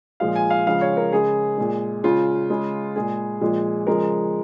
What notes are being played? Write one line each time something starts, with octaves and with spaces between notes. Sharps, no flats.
A#2 F3 G#3 F5
G#5
F5
C#3 F3 G#3 F5
C#5
A#4
C#3 G#3 G#4
A#2 G#3
C#3 G#3 F4
C#3 G#3
A#2 G#3 G#4
A#2 F3 G#3
C#3 F3 G#3 A#4